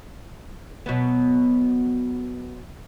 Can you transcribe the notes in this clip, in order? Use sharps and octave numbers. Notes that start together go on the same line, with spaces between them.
B2 F#3 B3